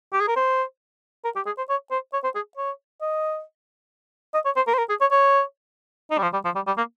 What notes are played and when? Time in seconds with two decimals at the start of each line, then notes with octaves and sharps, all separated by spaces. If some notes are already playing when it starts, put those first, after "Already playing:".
0.13 G4
0.20 G#4
0.28 A#4
0.36 C5
1.24 A#4
1.36 G4
1.46 G#4
1.57 C5
1.69 C#5
1.91 C5
2.13 C#5
2.24 C5
2.35 G#4
2.57 C#5
3.01 D#5
4.34 D#5
4.45 C#5
4.56 C5
4.67 A#4
4.73 C5
4.78 A#4
4.89 G#4
5.01 C#5
5.11 C#5
6.11 D#4
6.18 G3
6.22 F3
6.33 G3
6.45 F3
6.55 G3
6.67 G3
6.77 A#3